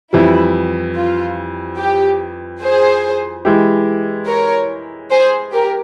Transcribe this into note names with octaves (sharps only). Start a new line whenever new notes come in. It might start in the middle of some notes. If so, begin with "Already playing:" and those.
F2 E3 G3 E4
F4
G4
G#4 C5
E3 G#3 E4 G4
A#4 C#5
G#4 C5
G4 A#4